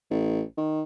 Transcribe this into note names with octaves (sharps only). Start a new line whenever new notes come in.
A1
D#3